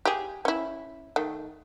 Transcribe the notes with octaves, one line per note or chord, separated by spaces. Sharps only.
G4 G#4
C#4 E4
D#3 A3